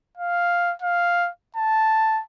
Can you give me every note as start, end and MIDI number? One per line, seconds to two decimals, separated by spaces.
0.17 0.73 77
0.82 1.29 77
1.56 2.22 81